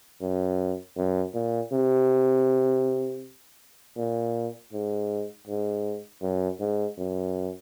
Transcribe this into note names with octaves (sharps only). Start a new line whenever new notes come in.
F#2
F#2
A#2
C3
A#2
G#2
G#2
F#2
G#2
F#2